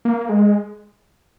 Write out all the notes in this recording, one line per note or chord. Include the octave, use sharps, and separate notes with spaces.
A#3
G#3